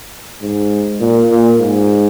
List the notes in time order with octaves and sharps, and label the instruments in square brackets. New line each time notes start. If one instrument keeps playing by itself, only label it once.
[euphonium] G#2
A#2
A#2
G#2